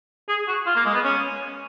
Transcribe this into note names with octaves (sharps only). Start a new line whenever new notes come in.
G#4
F#4
F4
A#3
G#3
B3
C#4